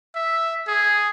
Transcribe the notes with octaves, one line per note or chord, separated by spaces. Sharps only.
E5
G#4